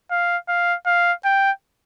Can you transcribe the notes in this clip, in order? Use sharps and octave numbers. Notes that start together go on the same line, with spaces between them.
F5
F5
F5
G5